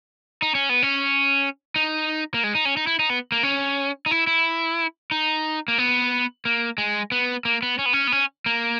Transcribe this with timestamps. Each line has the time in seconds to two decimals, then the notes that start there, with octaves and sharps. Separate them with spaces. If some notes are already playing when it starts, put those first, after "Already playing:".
0.42 D#4
0.55 C#4
0.69 B3
0.82 C#4
1.76 D#4
2.34 A#3
2.44 G#3
2.55 D#4
2.65 C#4
2.77 D#4
2.87 E4
2.99 D#4
3.10 B3
3.32 A#3
3.43 C#4
4.06 D#4
4.11 E4
4.27 E4
5.11 D#4
5.68 A#3
5.78 B3
6.45 A#3
6.78 G#3
7.12 B3
7.45 A#3
7.62 B3
7.79 C#4
7.86 B3
7.93 C#4
8.07 B3
8.12 C#4
8.46 A#3